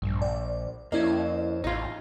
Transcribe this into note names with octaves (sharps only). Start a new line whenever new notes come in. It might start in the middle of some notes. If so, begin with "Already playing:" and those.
A#1 G2
D5
F2 A#3 C#4 E4 D5 D#5
A1 D#4 F4